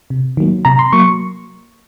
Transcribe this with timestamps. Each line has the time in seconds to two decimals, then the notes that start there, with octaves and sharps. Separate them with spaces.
0.10 C3
0.37 D#3 F#3 A#3
0.65 C3 A#5
0.79 C6
0.93 F#3 A#3 C#6